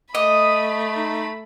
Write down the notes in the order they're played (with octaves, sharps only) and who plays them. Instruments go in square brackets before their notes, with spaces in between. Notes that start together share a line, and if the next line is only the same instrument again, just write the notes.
[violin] A3 B5 [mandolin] D#5 [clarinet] D#6
[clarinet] D#4